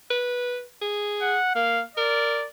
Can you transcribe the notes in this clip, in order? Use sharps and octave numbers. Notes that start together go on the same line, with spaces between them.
B4
G#4
F#5
A#3 F5
A#4 D5